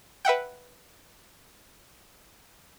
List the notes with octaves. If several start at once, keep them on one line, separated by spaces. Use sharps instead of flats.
B4 E5 F#5 G5